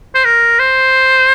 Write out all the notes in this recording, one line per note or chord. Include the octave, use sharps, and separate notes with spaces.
C5
A#4
C5